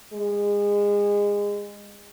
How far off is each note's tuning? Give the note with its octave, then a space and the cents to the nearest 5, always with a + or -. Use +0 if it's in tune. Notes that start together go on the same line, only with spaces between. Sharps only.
G#3 -25